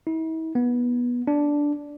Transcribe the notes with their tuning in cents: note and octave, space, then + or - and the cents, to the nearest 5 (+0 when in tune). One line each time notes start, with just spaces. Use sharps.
E4 -45
B3 -20
D4 -5